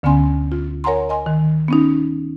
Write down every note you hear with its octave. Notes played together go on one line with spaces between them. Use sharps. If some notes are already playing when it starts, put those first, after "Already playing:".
D2 D3 B3 C#4 G#5 C6
F4
A#4 C#5 F#5 G#5 A#5 C6
D#5 G#5 C6
D#3
B3 C#4 D#4